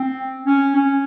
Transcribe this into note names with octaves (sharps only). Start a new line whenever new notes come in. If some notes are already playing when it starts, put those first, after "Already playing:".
Already playing: C4
C#4
C#4